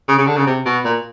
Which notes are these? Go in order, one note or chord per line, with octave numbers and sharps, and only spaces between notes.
C#3
C#3
D3
C#3
C3
B2
A#2